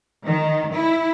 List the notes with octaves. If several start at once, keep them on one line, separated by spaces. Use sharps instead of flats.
D#3
E4